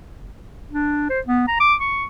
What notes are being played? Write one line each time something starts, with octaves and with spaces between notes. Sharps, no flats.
D4
C5
B3
A#5
D6
C#6